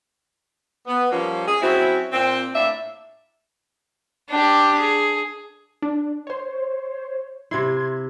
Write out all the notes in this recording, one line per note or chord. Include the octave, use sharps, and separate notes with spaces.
B3
F3 G3 A#3 C#4
G#4
F#3 C4 C#4 E4
A#2 C4
A2 A#3 D4 A4 E5
D4 G4
G#4
D4
C5 C#5
C3 E4 C6 G#6